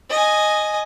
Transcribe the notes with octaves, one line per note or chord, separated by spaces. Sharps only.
D#5 G#5